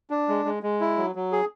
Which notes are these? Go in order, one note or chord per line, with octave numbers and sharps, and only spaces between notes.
D4
G#3
G#3
G#3
E4
F#3
F#3
G#4